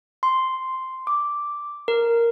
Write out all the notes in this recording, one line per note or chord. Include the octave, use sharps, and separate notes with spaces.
C6
D6
A#4